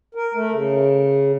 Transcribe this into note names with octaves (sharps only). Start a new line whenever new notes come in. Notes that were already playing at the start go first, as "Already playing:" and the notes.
A#4
A3
C#3